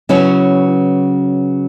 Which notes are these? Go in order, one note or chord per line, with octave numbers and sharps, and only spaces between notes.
C#3 F#3 B3 C#4 E4